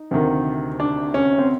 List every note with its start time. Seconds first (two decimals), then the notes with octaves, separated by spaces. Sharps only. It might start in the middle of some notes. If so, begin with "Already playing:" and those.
Already playing: D#4
0.11 D2 C3 D#3
0.80 D4
1.14 C#4
1.38 C4